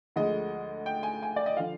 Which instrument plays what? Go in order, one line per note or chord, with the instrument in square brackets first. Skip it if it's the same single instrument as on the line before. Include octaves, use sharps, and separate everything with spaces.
[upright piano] D2 D3 F3 G#3 D#5
G5
G#5
G#5
D5
D#5
D3 F3 F5